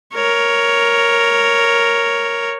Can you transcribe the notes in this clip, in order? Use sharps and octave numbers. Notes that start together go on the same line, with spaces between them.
A#4 C#5